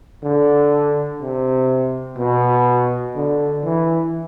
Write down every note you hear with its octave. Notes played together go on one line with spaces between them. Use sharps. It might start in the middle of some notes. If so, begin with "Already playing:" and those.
D3
C3
B2
D3
E3